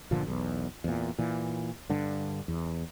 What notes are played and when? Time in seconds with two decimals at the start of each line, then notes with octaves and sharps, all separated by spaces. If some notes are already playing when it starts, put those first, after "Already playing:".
0.11 G1 A#2 D3 F3
0.27 B1 E2
0.84 E2 A#2
1.19 A#2 E3
1.90 G2 D3
2.48 E2